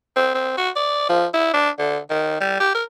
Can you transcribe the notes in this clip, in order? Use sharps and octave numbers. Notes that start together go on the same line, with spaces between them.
C4
C4
F#4
D5
F3
E4
D4
D3
D#3
G3
G4
A#4